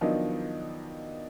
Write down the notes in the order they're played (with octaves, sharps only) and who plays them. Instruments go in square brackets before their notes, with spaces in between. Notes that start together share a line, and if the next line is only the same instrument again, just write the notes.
[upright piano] D#3 F3 F#3 B3 D4 D#4